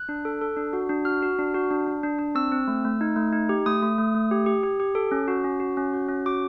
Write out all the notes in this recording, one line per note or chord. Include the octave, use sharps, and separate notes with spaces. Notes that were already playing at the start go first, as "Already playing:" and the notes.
Already playing: F#6
D4
A4
A4
D4
F#4
D4
F#4 F6
F#4
D4
F#4
D4
D4
D4
D4
C4 E6
C4
A3
A3
D#4
A3
D#4
G4
A3 D#6
A3
A3
A3
G4
G4
G4
G4
A4
C#4
F#4
C#4
F#4
C#4
F#4
C#4
F#4 D6